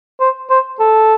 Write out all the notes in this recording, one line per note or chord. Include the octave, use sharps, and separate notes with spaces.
C5
C5
A4